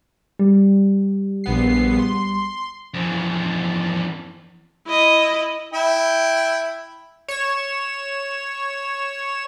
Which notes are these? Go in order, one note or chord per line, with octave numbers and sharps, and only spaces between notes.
G3
A#1 B3 C7
C6
F2 E3
E4 D#5
E4 G5
C#5 E7